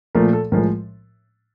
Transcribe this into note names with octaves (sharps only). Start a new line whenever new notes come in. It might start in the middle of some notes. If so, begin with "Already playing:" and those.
A#2 F3 A3 A#4
A4
A2 F3 G#3 A#4